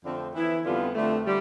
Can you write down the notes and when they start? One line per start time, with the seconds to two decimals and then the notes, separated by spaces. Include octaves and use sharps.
0.03 F2 D3 A3 C4
0.34 E3 B3 E4
0.64 F2 D3 G3 B3 F4
0.94 F2 D3 A3
1.25 D3 G3